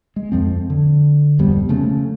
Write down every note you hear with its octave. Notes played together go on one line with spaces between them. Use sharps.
G#3
F2 F3 C4
D3
D1 F2 G3 B3
C#3 F3 A3 C#4